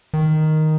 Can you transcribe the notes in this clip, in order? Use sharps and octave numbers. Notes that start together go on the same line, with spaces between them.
D#3